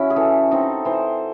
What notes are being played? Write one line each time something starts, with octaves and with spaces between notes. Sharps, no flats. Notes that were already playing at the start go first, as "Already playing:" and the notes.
Already playing: C#3 C#4 E4 F#4
G#4
E3 A4
C4 D#4
E3 C5